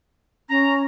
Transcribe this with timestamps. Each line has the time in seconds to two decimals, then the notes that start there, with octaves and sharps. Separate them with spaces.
0.50 C#4 A#5